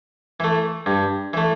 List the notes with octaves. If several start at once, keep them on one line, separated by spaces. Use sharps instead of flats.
E3 A3
G2
E3 A3